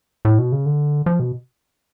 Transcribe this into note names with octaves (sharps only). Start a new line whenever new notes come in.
A2
B2
C#3
D3
F3
B2